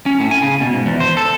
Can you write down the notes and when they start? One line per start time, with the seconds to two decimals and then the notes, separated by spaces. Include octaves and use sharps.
0.06 C#4
0.20 A2
0.31 G#5
0.42 C#3
0.61 B2
0.73 G#2
0.86 E2
1.00 C5
1.17 A4